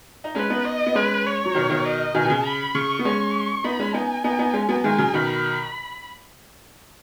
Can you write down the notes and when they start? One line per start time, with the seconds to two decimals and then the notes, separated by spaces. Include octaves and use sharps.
0.24 D#4
0.35 G#3 C#4 B4
0.50 B3 D#4
0.65 D#5
0.86 B3
0.95 G#3 C#4 B4
1.26 C#5
1.45 F#3
1.55 B2 D#3
1.70 B2 D#3
1.85 D#5
2.14 B2 D#3 G#5
2.25 B2
2.30 C#3
2.45 B5
2.75 C#3 C#6
2.99 B3
3.04 G#3 C#4 C#6
3.64 B3 D#4 B5
3.79 G#3 C#4
3.94 B3 D#4 G#5
4.24 B3 D#4
4.39 B3 D#4
4.53 G#3 C#4
4.69 F#3 B3
4.84 D#3 G#3 G#5
4.98 C#3 F#3
5.14 B2 D#3 B5